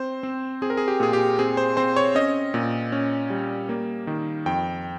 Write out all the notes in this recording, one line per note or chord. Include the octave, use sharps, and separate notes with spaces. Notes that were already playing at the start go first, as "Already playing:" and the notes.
Already playing: C4 C5
C4
C4 G#4
A#4
G#4
G4
A#2 G#4
G4
C4 G#4
C5
C4 C5
C#5
C#4 D#5
A#2
C#4
G3
A#3
D#3
F2 G5